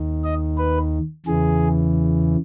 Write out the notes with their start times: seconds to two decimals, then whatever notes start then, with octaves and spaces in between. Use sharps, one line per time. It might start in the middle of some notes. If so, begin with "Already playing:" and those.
Already playing: D#2 D#3
0.24 D#5
0.58 B4
1.26 E2 C#3 E3 G#4